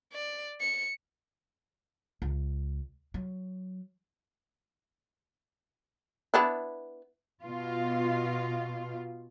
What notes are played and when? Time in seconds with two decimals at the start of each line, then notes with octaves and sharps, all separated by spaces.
0.13 D5
0.61 C#7
2.22 C#2
3.14 F#3
6.34 B3 D4 E4
7.44 B2 F4